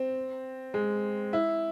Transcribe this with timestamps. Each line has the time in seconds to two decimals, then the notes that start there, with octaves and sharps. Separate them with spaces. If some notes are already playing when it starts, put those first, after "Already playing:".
Already playing: C4
0.74 G#3
1.33 E4